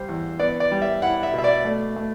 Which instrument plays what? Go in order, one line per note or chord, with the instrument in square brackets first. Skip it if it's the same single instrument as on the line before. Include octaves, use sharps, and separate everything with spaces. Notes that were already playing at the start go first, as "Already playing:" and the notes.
Already playing: [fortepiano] G3 C5
E2
B3 D5
D5
G3
E5
E4 F#5
E5
B2
E5
D5
A3
A3